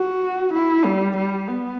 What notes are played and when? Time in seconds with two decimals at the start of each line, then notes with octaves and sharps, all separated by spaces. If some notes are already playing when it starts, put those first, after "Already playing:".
Already playing: F#4
0.54 E4
0.85 G3
1.17 G3
1.48 B3